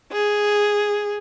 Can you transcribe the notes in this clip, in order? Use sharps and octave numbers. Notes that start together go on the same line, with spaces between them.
G#4